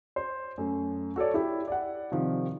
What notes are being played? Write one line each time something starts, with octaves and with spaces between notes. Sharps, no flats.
C5
F#2 A3
F#4 A4 C#5 D5
E4 G4
D5 F#5
C3 D#3 F3